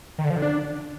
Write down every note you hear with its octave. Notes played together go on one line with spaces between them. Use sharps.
D#3
D3
F3
D3
D4